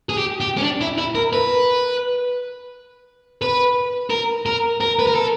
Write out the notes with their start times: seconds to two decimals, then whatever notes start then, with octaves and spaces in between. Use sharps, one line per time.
0.09 G#4
0.17 G4
0.40 G4
0.57 C#4
0.63 D4
0.81 E4
0.98 E4
1.15 A#4
1.33 B4
3.42 B4
4.10 A#4
4.46 A#4
4.81 A#4
4.99 B4
5.07 A#4
5.15 A4